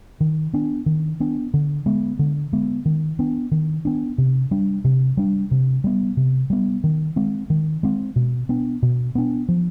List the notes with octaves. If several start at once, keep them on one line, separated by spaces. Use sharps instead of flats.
D#3
B3 D4
D#3
B3 D4
D3
G#3 B3
D3
G#3 B3
D#3
B3 D4
D#3
B3 D4
C3
G3 D4
C3
G3 D4
C3
G3 B3
C3
G3 B3
D#3
G#3 C4
D#3
G#3 C4
B2
B3 D4
B2
B3 D4
F3